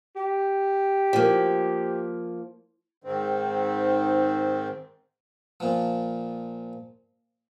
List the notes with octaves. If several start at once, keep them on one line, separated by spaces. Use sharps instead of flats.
G4
F3 A#3
G#2 D#3 C4
A#2 F3